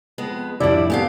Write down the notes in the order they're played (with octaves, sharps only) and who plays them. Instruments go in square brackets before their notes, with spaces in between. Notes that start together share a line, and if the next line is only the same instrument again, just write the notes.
[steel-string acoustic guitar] F2 G#3 B3
[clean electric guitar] C2 F2 A2 [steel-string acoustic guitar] G3 D4 [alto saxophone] E4 [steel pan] D5
[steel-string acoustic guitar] G#3 G4 F5 [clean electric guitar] A3 B3 C4